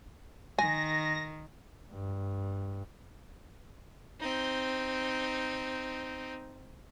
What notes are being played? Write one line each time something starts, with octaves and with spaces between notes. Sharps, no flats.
D#3 G#5 A#6
G2
C4 D#4